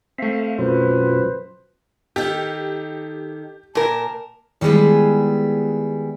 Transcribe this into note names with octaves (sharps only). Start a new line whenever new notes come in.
A3 C4 E5 F5
F#2 B2 F#3 F4 B4 C5
D#3 G4 A4
A#2 A#4 A5
D#3 G3 G#3 B3 E4 G#4